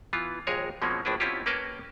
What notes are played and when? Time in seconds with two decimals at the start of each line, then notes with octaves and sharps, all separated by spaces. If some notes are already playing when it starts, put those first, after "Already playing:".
0.13 E3 B3 F4
0.47 A#1 D#2 G#3 G#4 A#4 C#5
0.82 B2 F3 G#3 A#3 C4 C#4
1.05 A#1 A2 D4 E4 B4
1.20 B2 C4 C#4 E4 F4 G4
1.46 A#3 C#4 A#4 B4 G5 A5